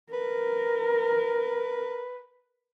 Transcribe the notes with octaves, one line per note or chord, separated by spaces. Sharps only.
A#4 B4